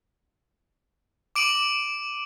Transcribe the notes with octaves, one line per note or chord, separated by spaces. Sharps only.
D6 D7 D#7 F#7